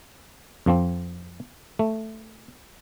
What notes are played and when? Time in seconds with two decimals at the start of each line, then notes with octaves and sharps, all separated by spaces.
0.66 F2 F3 C4
1.79 A3